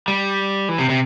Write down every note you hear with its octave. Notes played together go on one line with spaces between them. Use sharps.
G3
E3
C3
C3